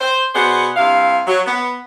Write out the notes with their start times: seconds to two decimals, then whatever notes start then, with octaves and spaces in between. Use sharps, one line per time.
0.01 C5
0.35 B2 B3 G#4 C5 D5 F#5
0.76 G2 C3 E4 F5
1.27 F#3
1.46 B3